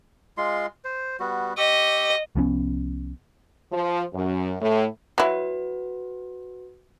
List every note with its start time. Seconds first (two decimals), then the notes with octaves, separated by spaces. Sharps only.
0.37 G#3 F4 C6
0.84 C5
1.20 G3 B3 F#4
1.58 G4 D#5 C#6 E6
2.35 C2 F3 B3 C#4
3.72 F3
4.13 F#2
4.60 A2
5.18 F#3 E4 F#4 B4